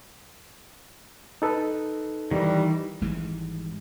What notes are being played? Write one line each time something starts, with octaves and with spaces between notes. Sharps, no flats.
D#4 A4 B4
D#3 E3 G3
G#1 G#2 E3 G3